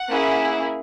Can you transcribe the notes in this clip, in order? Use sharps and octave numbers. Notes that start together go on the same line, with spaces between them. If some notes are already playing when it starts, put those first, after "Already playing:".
Already playing: F#5
A#3 C#4 E4 G#4